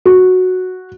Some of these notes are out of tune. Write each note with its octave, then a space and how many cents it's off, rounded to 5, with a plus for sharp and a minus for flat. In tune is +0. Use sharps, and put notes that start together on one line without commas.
F#4 -5